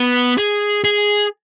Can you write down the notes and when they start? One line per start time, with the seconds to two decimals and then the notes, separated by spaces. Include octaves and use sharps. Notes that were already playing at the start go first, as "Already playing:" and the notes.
Already playing: B3
0.38 G#4
0.84 G#4